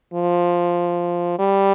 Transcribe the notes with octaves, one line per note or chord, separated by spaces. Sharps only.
F3
G3